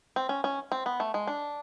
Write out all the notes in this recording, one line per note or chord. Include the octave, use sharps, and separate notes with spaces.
C4
C#4
C#4
C4
B3
A3
G#3
D4